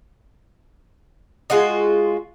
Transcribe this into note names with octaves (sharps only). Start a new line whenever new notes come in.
G#3 F4 F#4 D#5